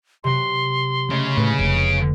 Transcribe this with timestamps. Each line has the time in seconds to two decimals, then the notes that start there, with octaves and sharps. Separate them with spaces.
0.24 C3 F#3 C6
1.10 C#3 G#3 A3
1.37 A2 B4
1.59 F1 D7